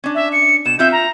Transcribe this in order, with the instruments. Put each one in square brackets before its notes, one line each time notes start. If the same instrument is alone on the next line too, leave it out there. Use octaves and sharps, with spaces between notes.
[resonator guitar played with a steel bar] C#4 D4
[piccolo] E5
C#7
[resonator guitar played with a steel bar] B2 [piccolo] E7
[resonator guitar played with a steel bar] C4 F4 E5 [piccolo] G6
[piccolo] A#5